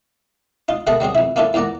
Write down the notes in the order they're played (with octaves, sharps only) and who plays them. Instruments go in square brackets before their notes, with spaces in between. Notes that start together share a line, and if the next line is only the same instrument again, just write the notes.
[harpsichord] D#4 F4
B2 A3 G#4 A#4 A5 B5
F#3 G3 C4 G#4
F2 E4
A#3 C#4 D4 E4 F4 A4
E2 A#2 D5 F#5 A#5